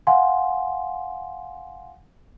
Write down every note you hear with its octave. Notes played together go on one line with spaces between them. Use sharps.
F5 F#5 G#5 C6